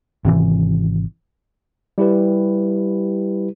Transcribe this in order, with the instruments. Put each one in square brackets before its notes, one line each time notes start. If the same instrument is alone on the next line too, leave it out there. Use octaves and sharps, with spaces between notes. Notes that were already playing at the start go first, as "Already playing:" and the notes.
[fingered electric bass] G#1 C3 E3
[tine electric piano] G3 E4 G4 B4